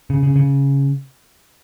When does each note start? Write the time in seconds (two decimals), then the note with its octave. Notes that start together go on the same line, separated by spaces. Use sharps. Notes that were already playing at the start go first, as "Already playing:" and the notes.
0.10 C#3
0.23 C#3
0.36 C#3